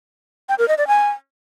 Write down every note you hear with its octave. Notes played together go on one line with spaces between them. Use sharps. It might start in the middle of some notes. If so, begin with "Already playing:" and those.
G5
A#4
D#5
D5
G#5